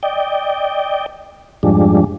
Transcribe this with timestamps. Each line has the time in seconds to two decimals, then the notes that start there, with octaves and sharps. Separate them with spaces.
0.03 D5 D#5 G5
1.63 F2 G#2 F3 G3 G#3 D4